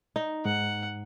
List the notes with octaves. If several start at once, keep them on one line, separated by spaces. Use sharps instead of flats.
D#4
G#2 F#5